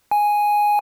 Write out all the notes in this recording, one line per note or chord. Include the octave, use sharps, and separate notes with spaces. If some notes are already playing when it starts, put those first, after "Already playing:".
G#5